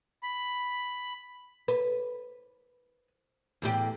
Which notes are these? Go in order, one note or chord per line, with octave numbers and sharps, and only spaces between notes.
B5
B4
E2 A2 G4